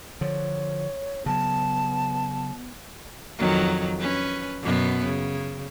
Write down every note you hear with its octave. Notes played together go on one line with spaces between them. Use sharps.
D3 F3 C#5
C#3 F#3 B3 A5
F2 D#3 F#3
C#4 B4
F#2 B2 B3
C#3